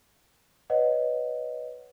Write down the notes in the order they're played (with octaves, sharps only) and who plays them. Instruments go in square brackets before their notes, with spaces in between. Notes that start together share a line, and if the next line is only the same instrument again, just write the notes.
[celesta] B4 C#5 D#5 F#5